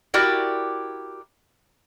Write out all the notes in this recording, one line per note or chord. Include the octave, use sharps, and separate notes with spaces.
E4 F#4 G4 A#4 D5